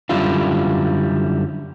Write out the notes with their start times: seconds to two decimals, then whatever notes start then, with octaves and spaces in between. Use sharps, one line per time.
0.09 F#2 D3 G3 E4 F4 F5